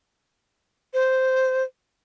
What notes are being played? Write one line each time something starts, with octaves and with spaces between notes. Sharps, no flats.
C5